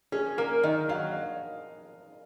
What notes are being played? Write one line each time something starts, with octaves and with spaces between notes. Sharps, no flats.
C#4 G#4
A#3 A#4
D#3 D#5
F#3 F5